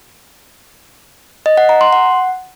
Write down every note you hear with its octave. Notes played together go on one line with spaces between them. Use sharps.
D#5
F#5
A#5
C6
F#5